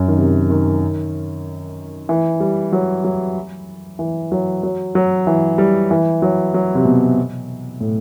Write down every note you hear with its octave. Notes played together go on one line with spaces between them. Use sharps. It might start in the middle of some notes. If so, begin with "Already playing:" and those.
Already playing: F#2
D#3
C3
D#3
E3
G3
F#3
F#3
E3
F#3
F#3
F#3
E3
G3
E3
F#3
F#3
C3
B2
A2